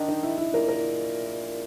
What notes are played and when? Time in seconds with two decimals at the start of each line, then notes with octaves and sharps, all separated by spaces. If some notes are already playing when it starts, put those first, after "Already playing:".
Already playing: D#3 D4
0.09 D#4
0.23 E4
0.38 E4
0.54 A#2 A#4
0.68 A#4